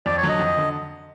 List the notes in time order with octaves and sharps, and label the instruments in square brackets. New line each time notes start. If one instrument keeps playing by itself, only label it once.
[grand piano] F2 [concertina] D5
[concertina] C#5
[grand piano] D3 F#3
[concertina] D#5
[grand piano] F2
D3